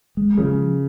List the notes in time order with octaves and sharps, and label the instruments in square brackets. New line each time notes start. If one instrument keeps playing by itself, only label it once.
[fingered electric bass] G#3
[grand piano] C#3 [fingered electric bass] F3